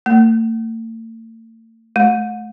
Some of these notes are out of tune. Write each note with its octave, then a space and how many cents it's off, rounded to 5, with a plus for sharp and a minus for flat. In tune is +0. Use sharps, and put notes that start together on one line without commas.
A3 +45
A3 -30